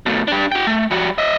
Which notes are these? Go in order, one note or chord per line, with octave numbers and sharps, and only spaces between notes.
B2 A3
D4 G4
F#4 G5
A3
G3 F#4
D#5 E5